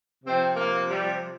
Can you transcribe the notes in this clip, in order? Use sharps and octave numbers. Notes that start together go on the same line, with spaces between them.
C3 F3 C4
A#3
G3